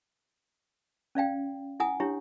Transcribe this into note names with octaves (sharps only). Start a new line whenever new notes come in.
C#4 D5 F5 G5
E4 F#5 G#5 D#6
D4 E4 G4 C#5